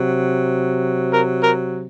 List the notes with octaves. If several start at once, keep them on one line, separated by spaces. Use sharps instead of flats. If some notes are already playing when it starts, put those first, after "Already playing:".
Already playing: C3 F#3
A#4
A#4